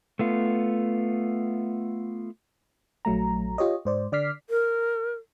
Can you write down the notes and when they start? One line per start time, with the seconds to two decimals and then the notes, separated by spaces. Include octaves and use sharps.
0.19 A3 B3 F4
3.05 A#1 F#3 A3 A#5
3.58 F4 G4 C#5 D#5
3.85 G#2 C5 D5
4.12 D3 D5 D6 F6 B6 C7
4.50 A#4